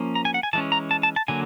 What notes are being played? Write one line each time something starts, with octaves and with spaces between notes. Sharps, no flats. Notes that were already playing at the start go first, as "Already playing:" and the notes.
Already playing: F3 A#3 C#4
A#5
G#5
F#5
G#5
E3 G#3 C#4 A5
A#5
A5
A5
A5
D3 F#3 A#3 G#5